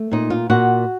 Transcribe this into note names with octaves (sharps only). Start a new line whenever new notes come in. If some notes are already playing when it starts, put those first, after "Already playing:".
Already playing: A3
A#2 D#4
F4
A#2 F#4